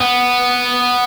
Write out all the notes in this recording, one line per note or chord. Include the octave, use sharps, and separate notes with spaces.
B3